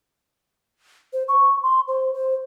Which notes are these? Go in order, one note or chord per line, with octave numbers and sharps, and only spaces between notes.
C5
C#6
C6
C5
C5